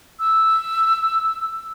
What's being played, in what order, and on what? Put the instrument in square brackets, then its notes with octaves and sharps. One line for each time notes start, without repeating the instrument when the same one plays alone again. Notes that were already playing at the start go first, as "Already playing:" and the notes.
[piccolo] E6